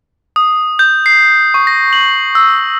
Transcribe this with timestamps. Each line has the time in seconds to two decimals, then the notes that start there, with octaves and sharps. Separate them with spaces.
0.36 D#6
0.79 G6
1.06 C7
1.54 C#6
1.67 A#6
1.93 F#7
2.35 E6